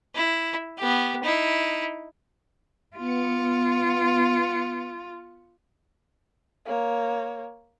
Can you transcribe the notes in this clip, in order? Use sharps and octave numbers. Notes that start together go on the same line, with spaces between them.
E4
B3 G4
D#4 E4
B3 F4 C#7
A#3 C#5